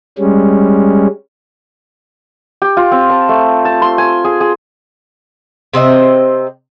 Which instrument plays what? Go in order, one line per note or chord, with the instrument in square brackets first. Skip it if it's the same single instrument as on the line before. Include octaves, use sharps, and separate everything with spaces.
[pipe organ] G3 G#3 C#4
[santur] G4
F4
C4
A5
A3
A5
C6
G#5
G#4
G#4
[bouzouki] C3 C4 D#5 E5